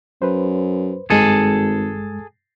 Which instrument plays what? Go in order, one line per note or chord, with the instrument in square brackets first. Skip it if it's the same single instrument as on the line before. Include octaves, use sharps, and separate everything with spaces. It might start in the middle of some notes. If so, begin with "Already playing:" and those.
[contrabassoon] F#2 [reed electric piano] B4 C5
[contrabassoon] G#1 [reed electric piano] G2 G#3 [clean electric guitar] G#4 A4